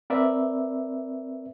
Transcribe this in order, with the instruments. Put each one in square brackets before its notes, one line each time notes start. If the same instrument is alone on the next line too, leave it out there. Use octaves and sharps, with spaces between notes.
[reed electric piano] C4 A#4 B4 D5 E5